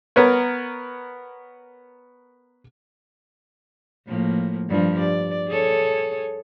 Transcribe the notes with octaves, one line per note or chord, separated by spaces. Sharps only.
B3 A#4 B4 C#5
A2 F3 A#3
G2 F3 G3
D5
G#4 A4 C#5